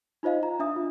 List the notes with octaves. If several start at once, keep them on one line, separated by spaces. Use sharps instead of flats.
D#4 F4 C5 D#5 F5
A#5
D4 E5 D#6
F4